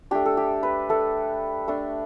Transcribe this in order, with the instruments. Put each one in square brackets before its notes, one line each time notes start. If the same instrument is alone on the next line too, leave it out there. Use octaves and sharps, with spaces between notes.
[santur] A3 D4 G4
A4
G4
B4
A3 D4 A4
A3 D4